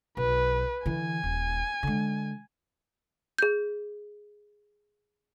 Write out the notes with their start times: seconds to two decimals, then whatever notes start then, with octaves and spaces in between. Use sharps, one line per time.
0.17 B1 B4
0.86 D3 E3 G#5
1.23 D#1
1.83 D3 G#3
3.39 G#4 G6